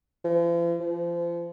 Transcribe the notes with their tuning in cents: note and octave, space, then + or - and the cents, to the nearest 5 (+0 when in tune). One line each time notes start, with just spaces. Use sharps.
F3 -45
F3 -30